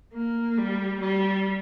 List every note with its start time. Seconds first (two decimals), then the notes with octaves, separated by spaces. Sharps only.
0.13 A#3
0.57 G3
1.00 G3